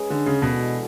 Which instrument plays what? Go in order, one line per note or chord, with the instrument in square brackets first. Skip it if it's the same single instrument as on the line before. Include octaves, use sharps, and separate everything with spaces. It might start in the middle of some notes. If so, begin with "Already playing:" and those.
Already playing: [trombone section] G#3 C#4 G#4 B4
[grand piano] D3
C#3
[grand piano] B2 [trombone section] E3 G#3 D4 F#4 A4